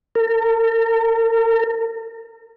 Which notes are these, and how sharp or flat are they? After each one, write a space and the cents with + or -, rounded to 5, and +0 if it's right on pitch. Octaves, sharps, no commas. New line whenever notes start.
A#4 -40